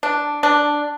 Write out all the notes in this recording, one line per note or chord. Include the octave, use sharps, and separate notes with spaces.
D4
D4